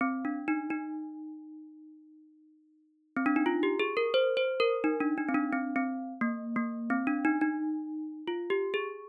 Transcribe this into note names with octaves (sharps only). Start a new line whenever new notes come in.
C4
D4
D#4
D#4
C4
D4
D#4
F4
G4
G#4
A#4
C5
C5
A#4
D#4
D4
D#4
C4
D4
C4
C4
A#3
A#3
C4
D4
D#4
D#4
F4
G4
G#4